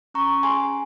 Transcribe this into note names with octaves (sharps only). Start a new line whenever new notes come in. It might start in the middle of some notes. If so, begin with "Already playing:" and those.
C#4 A#5 C#6
G#4 G#5 C6